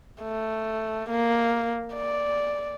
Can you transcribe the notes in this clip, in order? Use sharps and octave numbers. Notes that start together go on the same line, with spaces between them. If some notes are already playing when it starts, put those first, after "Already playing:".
A3
A#3
D5